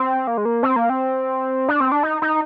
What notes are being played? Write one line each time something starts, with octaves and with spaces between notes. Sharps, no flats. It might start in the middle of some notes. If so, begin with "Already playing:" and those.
Already playing: C4
A#3
G#3
A#3
C4
A#3
C4
D4
C4
D4
D#4
D#4